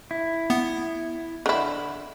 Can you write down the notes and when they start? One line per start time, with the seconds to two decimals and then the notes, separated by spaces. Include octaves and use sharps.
0.11 E4
0.50 B3
1.46 D3 E4